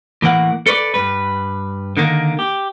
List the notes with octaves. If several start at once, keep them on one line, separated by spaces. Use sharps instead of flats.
A2 E3 A#3 F#5
A4 B4 C#5 D5
G2 B4
D3 D#3 A#3
G4